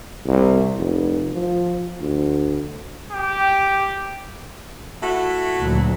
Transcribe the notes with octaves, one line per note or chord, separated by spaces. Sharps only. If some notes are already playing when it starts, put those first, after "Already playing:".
C2
F1
F3
D2
G4
A3 E4 F#4
D2 A#2 F#3